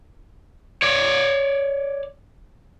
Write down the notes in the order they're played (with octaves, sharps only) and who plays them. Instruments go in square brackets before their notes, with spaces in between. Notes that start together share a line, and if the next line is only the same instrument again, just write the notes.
[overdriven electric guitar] C#5 D5